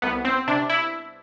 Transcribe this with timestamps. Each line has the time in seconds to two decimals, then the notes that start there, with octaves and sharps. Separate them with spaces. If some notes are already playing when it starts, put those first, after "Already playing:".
0.02 C2 B3
0.25 C4
0.47 C3 D4
0.70 E4